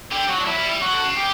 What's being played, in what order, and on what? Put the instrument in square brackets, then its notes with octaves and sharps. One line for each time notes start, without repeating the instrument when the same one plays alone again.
[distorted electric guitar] D3 [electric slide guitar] G4
[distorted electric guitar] F#3 [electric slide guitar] F#4
[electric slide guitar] D4
[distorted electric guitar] F#3 [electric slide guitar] E4
[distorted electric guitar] G3
G3
[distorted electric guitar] F#3 [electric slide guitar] F#4
[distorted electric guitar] D3
C#3
[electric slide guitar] G4